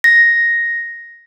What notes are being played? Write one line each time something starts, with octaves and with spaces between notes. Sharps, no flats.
A#6